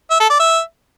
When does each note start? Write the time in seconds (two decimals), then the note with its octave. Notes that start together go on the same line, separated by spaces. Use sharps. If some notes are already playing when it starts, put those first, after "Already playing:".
0.10 E5
0.20 A4
0.30 D5
0.40 E5